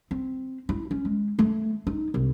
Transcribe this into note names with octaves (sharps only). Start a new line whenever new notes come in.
C4
E4
C#4
G#3
A3
D#4
C2